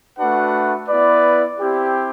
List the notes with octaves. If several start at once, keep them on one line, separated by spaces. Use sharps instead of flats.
A3 D4 F#4 B4 F#5
B3 E4 B4 D5
C4 E4 G4